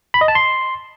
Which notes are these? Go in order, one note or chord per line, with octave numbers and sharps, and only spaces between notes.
B5
D#5
A5
C6